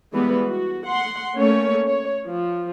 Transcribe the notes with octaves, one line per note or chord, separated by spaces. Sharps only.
E3 G3 G#3 B3 B4
F#4
F#5 C6
A3 A#3 C#4 C#5
C#5
F3